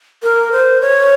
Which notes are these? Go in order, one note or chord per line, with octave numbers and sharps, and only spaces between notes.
A#4
C5
C#5